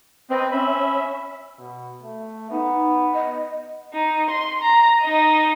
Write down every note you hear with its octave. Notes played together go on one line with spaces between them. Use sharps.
C4 B4 D#5
C#4 E5 B5
B2
A3
B3 D#4
D#5
D#4
C6
A#5
D#4 D#5